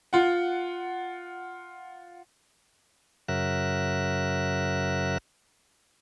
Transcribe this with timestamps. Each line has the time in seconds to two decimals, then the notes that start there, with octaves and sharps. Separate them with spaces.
0.13 F4 F#5
3.28 F#2 C#3 F#3 A#4 E5 F#6